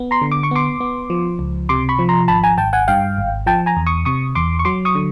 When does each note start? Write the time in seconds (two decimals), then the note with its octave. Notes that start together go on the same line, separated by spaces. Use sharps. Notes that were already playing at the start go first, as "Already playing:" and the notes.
Already playing: B3
0.11 A#5 C6
0.22 D3
0.32 D6
0.43 C#6
0.51 B3 C6 D6
0.81 B3
1.10 F3
1.39 C#2
1.69 C3 C6 D6
1.89 B5 C#6
1.99 F3
2.09 A#5 C6
2.28 G#1 A5 B5
2.43 G#5 A#5
2.58 G#1 G5 A5
2.73 F#5 G#5
2.88 G2 F5 G5
3.18 G#1
3.47 F3 G5 A5
3.66 G#5 A#5
3.76 E2
3.87 C#6 D#6
4.05 C3 C#6 D#6
4.35 E2 C6 D6
4.59 C#6
4.65 F#3 C6 D6
4.85 C#6 D#6
4.95 D3